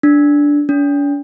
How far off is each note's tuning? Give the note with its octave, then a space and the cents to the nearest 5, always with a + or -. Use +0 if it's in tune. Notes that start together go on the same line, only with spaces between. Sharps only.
D4 -10
D4 -45